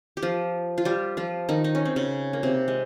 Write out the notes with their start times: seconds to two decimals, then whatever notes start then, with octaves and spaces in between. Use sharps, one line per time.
0.17 G4
0.22 F3 F4
0.78 F4
0.85 G3 G4
1.17 F3 F4
1.49 D#3 D#4
1.64 D#4
1.75 C#4
1.85 C4
1.96 C#3 C#4
2.33 A#3
2.43 C3 C4
2.68 G#3